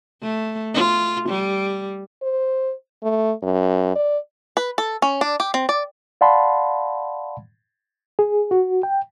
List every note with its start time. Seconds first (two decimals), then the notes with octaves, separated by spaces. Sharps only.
0.22 A3
0.74 F4
1.29 G3
2.22 C5
3.03 A3
3.43 F#2
3.95 D5
4.57 B4
4.78 A4
5.02 C#4
5.21 D4
5.40 G4
5.54 C4
5.69 D5
6.21 D5 F5 F#5 A5 B5 C6
8.19 G#4
8.51 F#4
8.83 G5